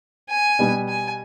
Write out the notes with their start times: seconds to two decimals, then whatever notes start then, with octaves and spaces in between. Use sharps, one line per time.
0.30 G#5
0.59 B2 G3 B3
0.89 G#5